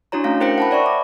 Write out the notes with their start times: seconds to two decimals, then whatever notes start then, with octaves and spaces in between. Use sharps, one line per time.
0.12 D4 E4 F#4 C#5 A#5
0.24 A3 C#4 D4 F5 A#6
0.40 E4 A#4 C5 G5 A#6 C#7
0.58 F#5 A5 B5
0.71 C#5 D5 E5 C#6
0.86 D6